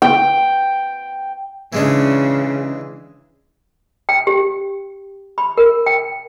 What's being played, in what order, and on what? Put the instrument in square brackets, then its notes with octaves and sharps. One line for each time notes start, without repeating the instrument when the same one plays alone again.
[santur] G5
[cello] C#3 [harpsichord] E3 G#3 D4
[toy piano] G5
G4
B5
A#4
G5